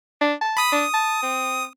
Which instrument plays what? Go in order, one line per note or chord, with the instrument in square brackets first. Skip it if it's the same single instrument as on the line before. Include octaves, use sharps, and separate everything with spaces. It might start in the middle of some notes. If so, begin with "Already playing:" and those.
[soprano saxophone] D4
A5
[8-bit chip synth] B5 D#6 B6
[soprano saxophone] D4 [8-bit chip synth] D#6
[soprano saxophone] A5
C4